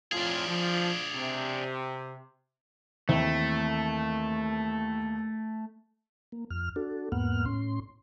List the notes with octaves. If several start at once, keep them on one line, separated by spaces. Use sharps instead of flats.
F2 A2 D4 F4 G#4
F3
C3
D#2 E3 A3 C4 E4
A#3
F2 F6
D4 F#4 A4
E2 G#2 A#3 B3 F#5 F6
A2 C#4 C6